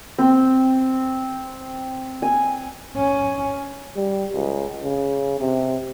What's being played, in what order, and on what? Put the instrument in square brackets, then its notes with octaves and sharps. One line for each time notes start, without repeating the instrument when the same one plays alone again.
[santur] C4
G#5
[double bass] C#4
[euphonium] G3
C#2
C#3
C3